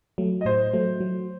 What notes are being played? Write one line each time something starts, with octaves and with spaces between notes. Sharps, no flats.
F#3 A3
D#5
A2 C5
F#3 A3
F#3